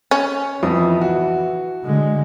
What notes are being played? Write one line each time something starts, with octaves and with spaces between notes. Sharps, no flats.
C#4
F2 E3 B3 D#6
F#4
D3 G#3